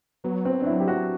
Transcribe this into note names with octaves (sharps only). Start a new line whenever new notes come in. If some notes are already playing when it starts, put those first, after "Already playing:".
F#3 B3
C4
D4
E4
G4
F#4